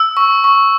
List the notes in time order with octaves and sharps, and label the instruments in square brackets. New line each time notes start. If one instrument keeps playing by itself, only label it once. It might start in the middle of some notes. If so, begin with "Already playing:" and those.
Already playing: [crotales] E6
C#6
C#6